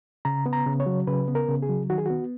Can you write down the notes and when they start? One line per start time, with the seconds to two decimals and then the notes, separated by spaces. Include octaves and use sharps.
0.25 C#3 A#5
0.46 B3
0.53 A#5
0.67 C#3
0.80 C#5
0.86 F#3
1.07 C#3 B4
1.28 B3
1.35 A#4
1.48 C#3
1.62 G#4
1.69 F#3
1.90 D#3 F#4
1.98 G#4
2.06 B3 F#4